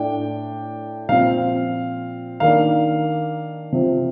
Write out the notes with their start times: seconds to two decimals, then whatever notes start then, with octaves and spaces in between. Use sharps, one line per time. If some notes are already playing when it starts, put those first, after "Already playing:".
Already playing: A2 A3 D4 G5
1.09 A#2 F3 C4 F5
2.40 D#3 A#3 D4 F5
3.72 C3 F3 C4